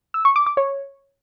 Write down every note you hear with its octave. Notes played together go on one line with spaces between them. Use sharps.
E6
C#6
D6
D6
C#5